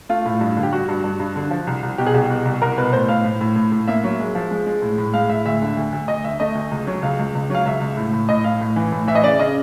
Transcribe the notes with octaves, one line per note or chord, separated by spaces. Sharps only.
A3 F4
A2
G2
D3
G4
G2 F#4
G2
G2
G2
D3
F3
C2
C2
B2 G4
G#4
C2 G4
B2
C2
C2 A#4
B2 B4
A2 C5
A2 F5
A2
A2
A2
A2
A#3 E5
F#3
G#3
F3
G#3
G#3
A2
A2
G#3 F5
A2 E5
D2 E5
D3
D2
D2
D2 D#5
D2 E5
A3 D#5
D2
C#2
F#3
C#2 F5
C#2
C#2
F#3 F5
C#2 E5
C#2
A2
A2
A2 D#5
A2 F5
A2
E3
A2
E3 E5
D#5
C#3 D5
C#3 D#5